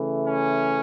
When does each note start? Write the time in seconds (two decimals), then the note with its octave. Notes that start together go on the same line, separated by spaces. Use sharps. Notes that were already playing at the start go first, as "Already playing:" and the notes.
Already playing: C#3 E3 A3
0.25 C#4